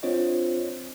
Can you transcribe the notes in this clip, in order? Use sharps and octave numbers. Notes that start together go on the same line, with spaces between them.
C4 D4 F4 C5 C#5 D#5